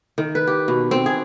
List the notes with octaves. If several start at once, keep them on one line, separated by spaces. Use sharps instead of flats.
D#3
B4
G4
B2
C4
G#4